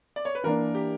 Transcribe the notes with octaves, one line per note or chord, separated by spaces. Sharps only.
D5
C#5
B4
E3 A#3 D4 A#4
G4